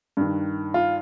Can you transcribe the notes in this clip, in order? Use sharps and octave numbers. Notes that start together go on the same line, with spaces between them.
G2 D#3
F4